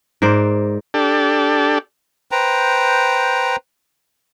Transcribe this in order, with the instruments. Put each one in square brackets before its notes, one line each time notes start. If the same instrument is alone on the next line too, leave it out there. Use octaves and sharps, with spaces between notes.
[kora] G#2 A#4 C5 D5
[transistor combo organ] D4 G4 A4
[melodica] B4 C5 G5 A#5